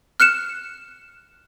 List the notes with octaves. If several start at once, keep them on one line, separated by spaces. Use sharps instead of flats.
F6 F#6 C#7 E7